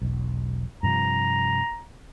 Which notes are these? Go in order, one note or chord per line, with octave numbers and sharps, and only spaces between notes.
E1 B1
G2 C3 F3 A#5